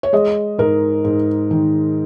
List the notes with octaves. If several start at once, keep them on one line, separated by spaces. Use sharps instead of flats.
C#5
G#3 D#5
G#2 A#4
G#2
D#3